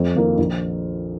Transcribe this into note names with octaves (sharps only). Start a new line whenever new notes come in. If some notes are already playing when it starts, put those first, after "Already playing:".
Already playing: F2
D#3 A#3 F4
A#1